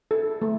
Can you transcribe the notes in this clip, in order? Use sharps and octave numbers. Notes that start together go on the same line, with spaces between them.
A4
A3